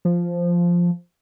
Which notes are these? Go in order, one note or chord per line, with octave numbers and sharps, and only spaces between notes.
F3